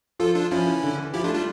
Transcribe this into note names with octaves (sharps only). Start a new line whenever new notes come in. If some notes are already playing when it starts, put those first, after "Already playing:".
F3 F4 A4
D4 F4
F3 C#4 E4
E3
D3
E3
F3 E4 G4
A3 D4 F4
G3 D4 F4